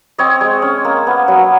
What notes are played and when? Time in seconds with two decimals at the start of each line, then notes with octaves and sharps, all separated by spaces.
0.18 C4 C#5 D#5
0.41 G#3
0.62 C#4
0.85 A#3
1.07 B3
1.28 F#3